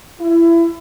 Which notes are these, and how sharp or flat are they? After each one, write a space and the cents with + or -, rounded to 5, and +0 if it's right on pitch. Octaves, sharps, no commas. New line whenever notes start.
E4 +25